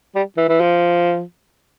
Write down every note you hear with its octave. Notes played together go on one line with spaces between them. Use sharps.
G3
E3
E3
F3